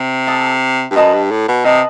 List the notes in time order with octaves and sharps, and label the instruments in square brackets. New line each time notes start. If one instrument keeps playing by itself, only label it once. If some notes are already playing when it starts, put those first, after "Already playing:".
Already playing: [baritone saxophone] C3
[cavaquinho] A4 E5 A5 D#6
[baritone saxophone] G2
[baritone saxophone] F#2 [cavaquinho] B4 D#5 A5 D#6
[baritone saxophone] G2
A2
B2
[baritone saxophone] C3 [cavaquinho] B4 D#5 A5 D#6